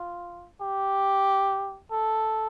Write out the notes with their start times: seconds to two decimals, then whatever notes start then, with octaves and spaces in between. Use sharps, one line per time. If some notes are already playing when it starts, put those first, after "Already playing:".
Already playing: F4
0.61 G4
1.92 A4